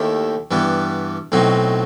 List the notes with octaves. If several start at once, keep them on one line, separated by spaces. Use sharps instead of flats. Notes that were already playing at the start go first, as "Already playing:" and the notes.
Already playing: D#2 D#3 A3 E4 G4
G2 E3 G3 B3
B1 A2 F#3 C4 D#4